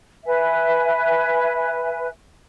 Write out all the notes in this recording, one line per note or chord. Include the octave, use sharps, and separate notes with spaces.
B4 E5 G#5